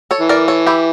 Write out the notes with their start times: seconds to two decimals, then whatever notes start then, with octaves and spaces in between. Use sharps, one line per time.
0.11 A4 C#5
0.20 E3
0.29 A#4 D5
0.48 A4 C#5
0.67 E4 G4